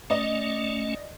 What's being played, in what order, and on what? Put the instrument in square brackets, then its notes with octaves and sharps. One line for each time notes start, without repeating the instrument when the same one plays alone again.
[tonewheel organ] A3 C#4 [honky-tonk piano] D5 D#5